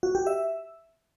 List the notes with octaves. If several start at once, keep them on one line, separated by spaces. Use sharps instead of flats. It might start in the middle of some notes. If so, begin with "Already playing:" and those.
F#4
G4
E5